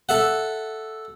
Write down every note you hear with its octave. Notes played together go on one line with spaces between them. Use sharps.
A4 E5 F#5